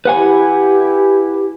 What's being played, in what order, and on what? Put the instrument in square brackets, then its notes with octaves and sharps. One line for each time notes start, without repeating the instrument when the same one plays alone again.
[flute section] E4 G4 [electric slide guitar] B4 F#5 G#5